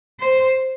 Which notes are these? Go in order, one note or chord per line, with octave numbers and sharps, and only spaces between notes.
C5